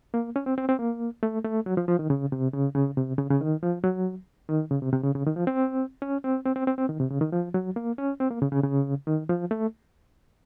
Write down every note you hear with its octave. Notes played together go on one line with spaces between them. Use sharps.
A#3
C#4
C4
C4
C4
A#3
A3
A3
F#3
F3
F3
D#3
C#3
C3
C#3
C#3
C3
C#3
C#3
D#3
F3
F#3
D#3
C#3
C3
C3
C#3
C#3
D#3
F3
C4
C#4
C4
C4
C4
C4
C4
D#3
C3
C#3
D#3
F3
F#3
A#3
C#4
C4
A#3
C#3
C#3
C#3
D#3
F3
A3